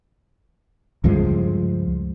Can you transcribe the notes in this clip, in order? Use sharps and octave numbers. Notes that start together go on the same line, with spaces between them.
C#2 G2 F3 G#3